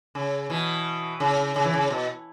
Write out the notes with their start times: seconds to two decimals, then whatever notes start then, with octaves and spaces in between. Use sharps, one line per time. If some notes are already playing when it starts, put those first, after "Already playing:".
0.15 C#3
0.50 B2 E3
1.20 C#3
1.56 C#3
1.64 E3
1.74 C#3
1.90 B2